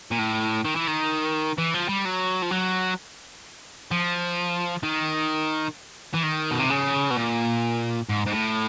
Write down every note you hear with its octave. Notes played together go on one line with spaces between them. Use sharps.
A#2
A2
D#3
E3
D#3
E3
F3
G3
F#3
F3
F#3
F3
D#3
E3
D#3
B2
C3
C#3
B2
A#2
G#2
G#2
A2